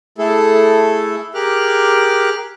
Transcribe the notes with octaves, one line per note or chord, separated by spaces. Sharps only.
A3 E4 G#4 A4
G4 G#4 A#4 D6 F6 F#6